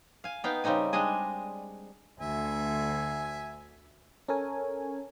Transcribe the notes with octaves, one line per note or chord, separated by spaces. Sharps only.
F5 G#5
B3 D#4 F5 G5
C#3 G3 C4 D#4 G#5
G3 G#3 D4 G#4 D#5 G#5
D2 E5 G#5
C#4 A4 A#4 C#5 G#5